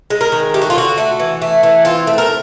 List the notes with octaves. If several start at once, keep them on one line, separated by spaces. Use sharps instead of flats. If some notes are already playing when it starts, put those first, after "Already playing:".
G#3
A#4
D#3
A3 G4
F#4
F4
D3 F#4
A3
E3
A3
E3
C4 F4
A3
A#4